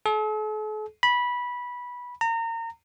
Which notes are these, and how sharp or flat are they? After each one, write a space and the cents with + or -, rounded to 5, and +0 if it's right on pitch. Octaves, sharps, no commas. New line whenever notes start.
A4 -45
B5 -15
A#5 -30